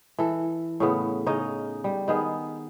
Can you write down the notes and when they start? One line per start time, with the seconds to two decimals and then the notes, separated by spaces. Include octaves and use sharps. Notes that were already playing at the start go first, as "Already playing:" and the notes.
0.18 E3 A4
0.80 A2 C#3 B3
1.26 C#3 D#4 C#5 D#5
1.84 G3
2.08 D#3 B3 G#4